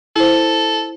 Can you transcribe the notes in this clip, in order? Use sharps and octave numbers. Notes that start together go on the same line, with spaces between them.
E4 A4 C5